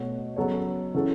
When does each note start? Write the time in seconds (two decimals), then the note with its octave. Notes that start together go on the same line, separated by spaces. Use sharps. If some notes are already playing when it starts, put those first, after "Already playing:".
Already playing: B2 A3 F#4 C#5
0.36 C#3 F#3 B3 A4 C#5
0.94 C#3 E3 C#4 F#4 A4